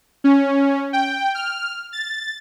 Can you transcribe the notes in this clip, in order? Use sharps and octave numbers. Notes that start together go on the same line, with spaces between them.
C#4
G5
F6
A6